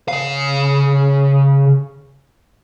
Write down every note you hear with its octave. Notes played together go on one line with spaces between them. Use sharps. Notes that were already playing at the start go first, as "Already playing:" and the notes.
C#3 F5